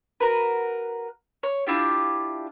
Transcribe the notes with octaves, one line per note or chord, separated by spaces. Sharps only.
F#4 A#4 B4
C#5
D4 E4 F4 G4